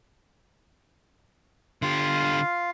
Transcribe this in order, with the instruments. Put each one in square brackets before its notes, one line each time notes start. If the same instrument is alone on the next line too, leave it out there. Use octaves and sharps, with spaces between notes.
[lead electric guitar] D3 G4 [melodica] F4 F5